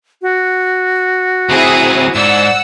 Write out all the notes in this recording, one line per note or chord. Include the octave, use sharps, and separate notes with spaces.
F#4
D2 C4 E4 G#4 D#6
G#2 D5 F#5 E6